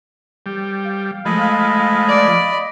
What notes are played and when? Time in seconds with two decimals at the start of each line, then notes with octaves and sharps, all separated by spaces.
0.46 G3
0.84 F5
1.25 F3 G#3 A3 D#5 B5
2.08 D5